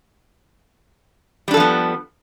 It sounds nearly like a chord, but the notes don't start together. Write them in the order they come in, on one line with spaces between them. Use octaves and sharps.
G3 D4 A4 F3 B3